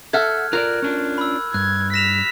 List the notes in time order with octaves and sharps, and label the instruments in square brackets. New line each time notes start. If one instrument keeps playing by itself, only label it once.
[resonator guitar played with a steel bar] A4 E5 F#5 [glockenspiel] F6 F#6 G#6
[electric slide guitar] F4 C#5 D5 [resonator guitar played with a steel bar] A#4 [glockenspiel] F#6
[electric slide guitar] C#4 D4 F4
[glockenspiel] B5 E6
[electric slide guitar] G2 [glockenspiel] F#6 [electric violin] G#6
[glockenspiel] A#6 E7 F7 [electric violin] B6